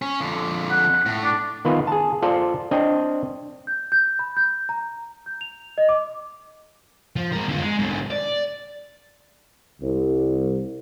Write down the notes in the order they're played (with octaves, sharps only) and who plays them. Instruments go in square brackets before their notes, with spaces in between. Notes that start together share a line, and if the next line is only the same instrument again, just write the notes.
[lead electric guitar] C#4
F2 D3
[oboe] F#5
[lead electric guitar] A2
[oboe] D4
[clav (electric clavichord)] D#3 B3 F4 B4
G#4 A5
F4 A4 C5 D5
C4 D4 D#5
[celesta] G6
G6
B5
G6
A#5
G6
F7
D#5
D6
[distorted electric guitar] F3
G#3 A#4
D3 F4
G#3
G#2 D3
D5
[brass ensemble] C2